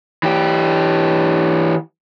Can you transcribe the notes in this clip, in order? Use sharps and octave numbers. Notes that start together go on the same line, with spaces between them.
E3 G4